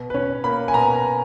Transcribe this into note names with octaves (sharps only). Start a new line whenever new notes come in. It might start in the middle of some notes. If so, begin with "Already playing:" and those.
Already playing: B2
B4
C#4 C#5
A#3 B5
G#5
B2 A#5